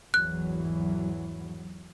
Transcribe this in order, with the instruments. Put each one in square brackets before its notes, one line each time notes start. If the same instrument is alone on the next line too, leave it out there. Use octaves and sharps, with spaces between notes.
[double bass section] G#1 E2 E3 [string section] F#3 [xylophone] F#6